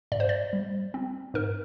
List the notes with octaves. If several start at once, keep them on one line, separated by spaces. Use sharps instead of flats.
G#2 D5
C5
D5
G3
C4
G#2 A#4